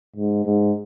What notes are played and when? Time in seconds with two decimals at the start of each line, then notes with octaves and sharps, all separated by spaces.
0.16 G#2
0.45 G#2